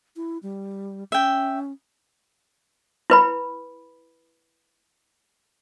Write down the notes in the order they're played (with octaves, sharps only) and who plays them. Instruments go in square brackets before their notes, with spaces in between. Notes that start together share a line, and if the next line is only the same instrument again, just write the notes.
[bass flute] E4
G3
[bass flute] C#4 [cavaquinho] E5 G5
[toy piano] E4 B4 B5